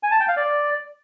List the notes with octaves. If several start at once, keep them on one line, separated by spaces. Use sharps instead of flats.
G#5
A5
G5
F5
D5